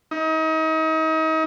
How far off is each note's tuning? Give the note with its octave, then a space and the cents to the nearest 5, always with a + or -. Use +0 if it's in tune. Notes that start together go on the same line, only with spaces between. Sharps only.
D#4 +35